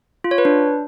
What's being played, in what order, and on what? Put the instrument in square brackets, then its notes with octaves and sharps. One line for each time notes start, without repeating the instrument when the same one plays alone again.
[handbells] F4
C#5
B4
D4